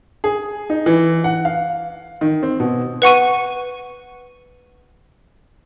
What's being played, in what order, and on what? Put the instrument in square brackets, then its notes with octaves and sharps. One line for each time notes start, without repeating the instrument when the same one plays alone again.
[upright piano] G#4
D#4
E3
F#5
F5
D#3
C4
B2
[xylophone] B4 F#5 C#6 D#7